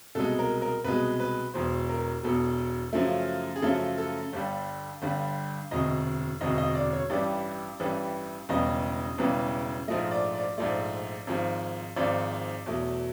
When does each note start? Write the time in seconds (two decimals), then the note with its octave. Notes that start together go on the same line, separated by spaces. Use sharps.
0.15 C2 B2 G#3 A4
0.39 A#4
0.62 A#4
0.84 C2 B2 G#3 B4
1.20 B4
1.54 E1 E2 B2 C5
1.89 A#4
2.23 E1 E2 B2 A4
2.93 F#2 C#3 F3 A3
3.56 G#4
3.62 F#2 C#3 F3 A3 A4
3.98 A4
4.33 G1 G2 D3 G3
5.02 G1 G2 D3 G3
5.71 E1 D2 C3 D#5
6.41 E1 D2 C3 D#5
6.58 D#5
6.75 D5
6.93 C#5
7.10 A1 G2 E3 G3 D5
7.80 A1 G2 E3 G3
8.49 E1 E2 C#3 E3 G3 D#5
9.18 E1 E2 C#3 E3 G3
9.88 A#1 G#2 F3 A3 D#5
10.11 D5
10.35 D5
10.58 A#1 G#2 F3 A3 D5
11.27 G#1 G#2 F3
11.96 G#1 G#2 F3 D5
12.66 E2 B2 F#3 A3